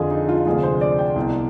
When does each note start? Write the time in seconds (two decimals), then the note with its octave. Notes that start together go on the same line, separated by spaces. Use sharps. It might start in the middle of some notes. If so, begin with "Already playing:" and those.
Already playing: F2 D3 F3 F4 G#4
0.11 D#4
0.29 F4
0.46 D2 C3 F3 G#4
0.63 C5
0.81 D5
0.99 G5
1.16 C2 B2